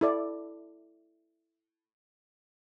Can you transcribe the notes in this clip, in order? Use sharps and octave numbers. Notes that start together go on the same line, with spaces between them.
E4 A4 D5